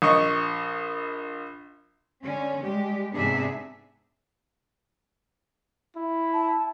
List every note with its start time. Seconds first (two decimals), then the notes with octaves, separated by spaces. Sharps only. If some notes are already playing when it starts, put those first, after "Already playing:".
0.02 A#1 D#5 C#6
2.22 D3 C#4
2.61 G3 G#3 G4
3.14 G#2 C3 B3 D4 G#4 E5
5.96 E4
6.34 A5